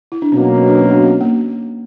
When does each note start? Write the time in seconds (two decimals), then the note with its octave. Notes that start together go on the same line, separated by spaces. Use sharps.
0.12 E4
0.22 D4
0.32 B2 F#3 A#3 C#4
0.54 C#4
0.67 D4
0.78 C#4
0.90 D4
1.02 C#4
1.21 A#3